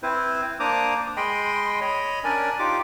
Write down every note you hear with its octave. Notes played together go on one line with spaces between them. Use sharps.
C4 E4 B4 C5
A#3 D4 C5 A#5 D6 D#6
G#3 D#5 G5 B5 C6
C#5 D#5 B5
C#4 D4 A#4 D5 G#5
D#4 F4 G4 D6